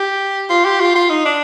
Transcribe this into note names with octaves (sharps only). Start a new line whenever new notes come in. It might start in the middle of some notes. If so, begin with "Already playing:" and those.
Already playing: G4
F4
G4
F4
F4
D#4
D4